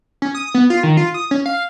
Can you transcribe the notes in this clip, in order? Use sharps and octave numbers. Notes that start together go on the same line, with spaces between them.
C#4
D#6
B3
F4
D#3
F4
D#6
C#4
F5